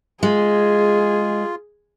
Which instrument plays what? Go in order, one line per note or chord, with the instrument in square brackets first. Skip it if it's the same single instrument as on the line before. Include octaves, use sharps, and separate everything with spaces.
[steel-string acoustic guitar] G#3 [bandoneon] F4 [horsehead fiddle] G#4